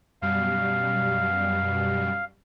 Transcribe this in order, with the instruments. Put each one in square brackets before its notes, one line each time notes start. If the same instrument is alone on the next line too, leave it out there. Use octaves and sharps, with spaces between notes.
[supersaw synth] F#2 B2 G3 [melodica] F5